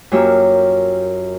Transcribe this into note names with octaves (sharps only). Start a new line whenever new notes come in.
F#2 A#3 F4 G4 C#5 E6